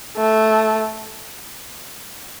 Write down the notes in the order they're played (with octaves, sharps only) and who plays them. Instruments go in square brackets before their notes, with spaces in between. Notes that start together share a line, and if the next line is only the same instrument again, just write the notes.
[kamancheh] A3